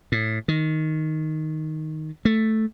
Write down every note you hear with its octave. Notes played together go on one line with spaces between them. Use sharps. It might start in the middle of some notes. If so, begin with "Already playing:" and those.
A2
D#3
A3